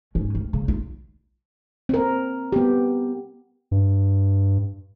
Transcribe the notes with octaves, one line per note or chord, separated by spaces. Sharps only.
G#2 C#4
D2
C#3
E4 F4
C4 A#4
B3 G4
G2